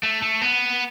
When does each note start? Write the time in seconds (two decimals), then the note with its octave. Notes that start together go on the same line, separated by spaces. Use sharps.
0.03 A3
0.22 A3
0.42 B3